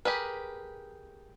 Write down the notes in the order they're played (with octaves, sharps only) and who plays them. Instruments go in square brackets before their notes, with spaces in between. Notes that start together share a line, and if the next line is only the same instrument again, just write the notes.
[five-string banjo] G4 G#4 A#4 B4